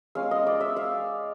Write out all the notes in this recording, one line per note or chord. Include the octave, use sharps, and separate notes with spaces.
G#3 C#4 F4 F5
D#5
D5
E5
F5